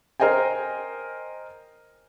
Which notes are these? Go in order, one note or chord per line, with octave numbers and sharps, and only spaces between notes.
A#4 C5 D#5 G5 G#5